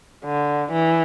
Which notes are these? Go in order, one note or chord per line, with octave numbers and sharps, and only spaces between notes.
D3
E3